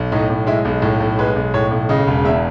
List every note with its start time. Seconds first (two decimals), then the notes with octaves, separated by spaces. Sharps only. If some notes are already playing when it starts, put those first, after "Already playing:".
Already playing: B1
0.12 A2 D#4
0.30 B1
0.47 G#3 E4
0.65 B1
0.82 A2
1.00 B1
1.19 G#3 B4
1.36 B1
1.54 A2 C#5
1.71 B1
1.89 C#3 D#5
2.08 E1
2.24 E2 E5